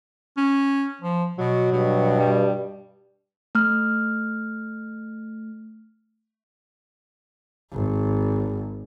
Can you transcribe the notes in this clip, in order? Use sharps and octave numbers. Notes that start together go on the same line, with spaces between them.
C#4
F3
B2 F#3
G2 B2
G3
A3 F6
G#1